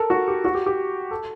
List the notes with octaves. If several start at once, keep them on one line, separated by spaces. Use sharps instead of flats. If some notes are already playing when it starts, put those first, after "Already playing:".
Already playing: A4 A#4
F#4
G4
F#4
G4
G4
A4